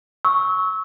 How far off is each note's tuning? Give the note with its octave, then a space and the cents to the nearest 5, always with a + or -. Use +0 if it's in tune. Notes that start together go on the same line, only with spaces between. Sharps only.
C#6 +0 E6 -25